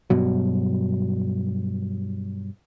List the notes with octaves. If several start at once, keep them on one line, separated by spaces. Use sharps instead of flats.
G2 B2 F#3